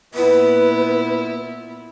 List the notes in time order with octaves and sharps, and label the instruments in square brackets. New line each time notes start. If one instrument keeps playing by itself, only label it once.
[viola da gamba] A#2 B3 E4 [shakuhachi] B4